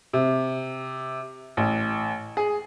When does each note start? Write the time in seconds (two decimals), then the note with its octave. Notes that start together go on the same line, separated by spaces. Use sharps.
0.13 C3
1.57 A1
2.37 G#4